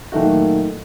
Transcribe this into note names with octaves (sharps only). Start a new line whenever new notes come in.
A#2 D#3 F#3 A3 F#4